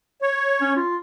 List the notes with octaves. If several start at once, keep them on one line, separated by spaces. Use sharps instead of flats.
C#5
C#4
F4